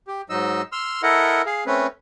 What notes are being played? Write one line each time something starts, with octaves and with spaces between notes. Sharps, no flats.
G4
G#2 F#3 D#4 D#5 E6
C6 E6 F6
E4 A4 A#4 D#5 F#5
G#4 F5
A3 C4 C#4 B4